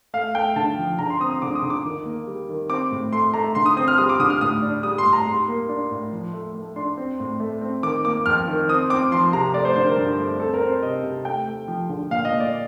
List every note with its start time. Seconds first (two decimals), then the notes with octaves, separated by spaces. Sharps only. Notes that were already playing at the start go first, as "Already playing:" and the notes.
0.14 A3 F5
0.35 A3 G5
0.56 D3 A5
0.78 F3
0.99 D3 A#5
1.10 C6
1.20 C4 D#6
1.31 D#6
1.42 D3 D6
1.55 D#6
1.62 D3
1.70 D6
1.85 D#3
2.05 A#3
2.27 G3
2.49 D#3
2.69 C4 D6
2.91 A2
3.12 A3 C6
3.34 A3 A#5
3.55 D3 C6
3.66 D#6
3.77 C4 D#6
3.88 F6
3.98 G3 D#6
4.09 D6
4.19 D3 D#6
4.30 F6
4.41 A2 D#6
4.62 D4
4.83 G3 D#6
4.98 C6
5.05 A2
5.13 A#5
5.27 G3 C6
5.48 A#3
5.69 D4
5.91 A2
6.12 F3
6.33 A3
6.55 A3
6.76 D4 C6
6.97 C4
7.20 A2
7.40 A3
7.61 C4
7.83 D#3 D6
8.05 A#3 D6
8.26 F2 F6
8.48 D#3
8.69 C4 D#6
8.90 C4 D6
9.12 F3 C6
9.33 C3 A#5
9.54 A3 D5
9.65 C5
9.76 D3 C5
9.86 A#4
9.97 G2
10.18 A3
10.39 C4 A4
10.54 A#4
10.61 C4
10.68 C5
10.82 C3 D#5
11.04 C3
11.25 A3 G5
11.47 A3
11.68 F3
11.89 D3
12.11 A#2 F5
12.25 D#5
12.32 A#2
12.40 D5